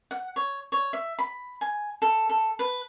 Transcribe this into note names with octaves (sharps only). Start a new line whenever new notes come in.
F#5
C#5
C#5
E5
B5
G#5
A4
A4
B4